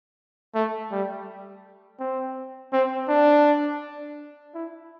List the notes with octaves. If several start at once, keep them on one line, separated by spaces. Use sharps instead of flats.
A3
G3
C4
C4
D4
E4